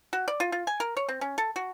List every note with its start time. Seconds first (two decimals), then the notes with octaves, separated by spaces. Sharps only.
0.13 F#4
0.28 D5
0.40 F4
0.52 F4
0.67 G#5
0.80 A#4
0.97 C#5
1.09 C4
1.21 C#4
1.38 A4
1.56 F#4